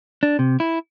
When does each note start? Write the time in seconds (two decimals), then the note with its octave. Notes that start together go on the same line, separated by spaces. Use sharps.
0.23 D4
0.39 C3
0.60 E4